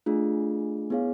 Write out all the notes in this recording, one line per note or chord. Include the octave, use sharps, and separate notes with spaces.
A3 D4 F4 G#4
B3 E4 G#4 C#5 F5